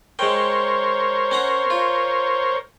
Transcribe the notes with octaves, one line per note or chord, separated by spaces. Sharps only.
G#3 A#4 C5 C#5 G5
C#4 F#5 A#5
F4